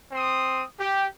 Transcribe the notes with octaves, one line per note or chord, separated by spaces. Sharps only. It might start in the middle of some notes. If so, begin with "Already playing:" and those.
C4 C6 D#6
G4